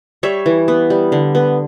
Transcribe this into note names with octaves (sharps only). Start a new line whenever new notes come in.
G3 C#5 E5
E3
B3
G3
D3
B3